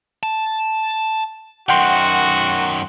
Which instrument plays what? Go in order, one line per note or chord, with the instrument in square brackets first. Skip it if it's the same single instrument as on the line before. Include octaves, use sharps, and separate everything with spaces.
[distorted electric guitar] A5
[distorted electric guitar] F#2 D#3 [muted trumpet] F#4 [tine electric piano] F#5 G5 C6